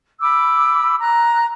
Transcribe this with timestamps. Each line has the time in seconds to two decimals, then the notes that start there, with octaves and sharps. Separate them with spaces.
0.21 B5 D6 E6
1.00 A#5 F#6